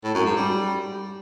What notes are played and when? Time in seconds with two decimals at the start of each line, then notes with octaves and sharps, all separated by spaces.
0.04 A2
0.14 F#2
0.25 G#2
0.36 G3